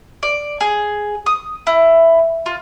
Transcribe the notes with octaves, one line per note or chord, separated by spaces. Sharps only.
D5
G#4
D#6
E4
F4